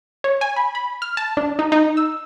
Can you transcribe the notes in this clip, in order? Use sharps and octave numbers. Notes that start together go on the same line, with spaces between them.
C#5
G#5
B5
B5
F6
A5
D4
D#4
D#4
E6